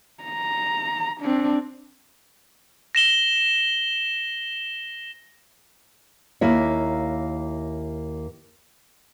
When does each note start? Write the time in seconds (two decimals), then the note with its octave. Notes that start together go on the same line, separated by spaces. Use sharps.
0.24 A#5
1.21 C4 D4
2.95 A#6 E7 G7
6.41 D#2 A#3 E4 C#5